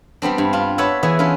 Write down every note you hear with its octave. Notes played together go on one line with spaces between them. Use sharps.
G3 B3 C4 D4
G2
D4 F4
B4 C#5 D5 E5 F#5 A5
E3 B3 G#4 E5
C#4 D4 F4 B4